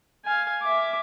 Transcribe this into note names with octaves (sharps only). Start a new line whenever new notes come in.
F5 G#5
E5 D6